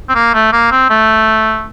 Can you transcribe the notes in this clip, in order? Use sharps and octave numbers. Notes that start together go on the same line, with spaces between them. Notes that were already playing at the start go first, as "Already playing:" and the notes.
C4
A#3
A3
A#3
C4
A3